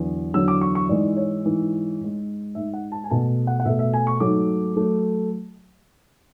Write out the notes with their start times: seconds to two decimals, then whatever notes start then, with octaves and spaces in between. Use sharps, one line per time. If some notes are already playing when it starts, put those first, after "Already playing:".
Already playing: E2 D3 F#3
0.34 E2 D3 F#3 E6
0.48 D6
0.61 C#6
0.75 C#6
0.89 G#2 E3 G#3 D5
1.17 C#5
1.45 G#2 E3 G#3
1.99 G#2 G#3
2.55 G#2 G#3 E5
2.74 F#5
2.92 A5
3.04 G#5
3.10 B2 A3 A5
3.47 F#5
3.60 F#5
3.65 B2 A3 E5
3.79 E5
3.93 G#5
4.07 C#6
4.20 G#2 F#3 A3 D6
4.76 F#3 A3